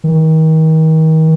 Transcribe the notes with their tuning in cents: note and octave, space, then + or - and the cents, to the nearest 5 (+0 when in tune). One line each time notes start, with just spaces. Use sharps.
D#3 +35